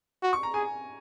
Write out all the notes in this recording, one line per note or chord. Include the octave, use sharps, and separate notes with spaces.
F#4
C#6
A#5
G#4 G#5